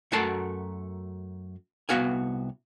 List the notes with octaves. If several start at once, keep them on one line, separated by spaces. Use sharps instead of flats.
F#2 A3 F#4 A#4 A5 C6
C2 F3 B3 F#4 F5 G#5